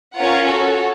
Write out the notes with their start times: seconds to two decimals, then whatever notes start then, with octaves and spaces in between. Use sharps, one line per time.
0.15 C#4 F4 A#4 C#5 F#5
0.50 F#4 A4 C#5